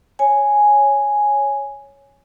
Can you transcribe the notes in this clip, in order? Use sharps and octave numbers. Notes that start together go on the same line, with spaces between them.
C#5 G#5